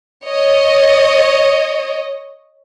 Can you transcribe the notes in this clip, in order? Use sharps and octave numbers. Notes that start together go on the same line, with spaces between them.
C#5 D#5